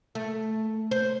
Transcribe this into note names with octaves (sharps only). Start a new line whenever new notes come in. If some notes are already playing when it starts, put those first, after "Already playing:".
A3
C5